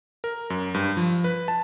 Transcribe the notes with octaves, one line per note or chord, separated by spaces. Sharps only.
A#4
F#2
G2
F3
B4
A5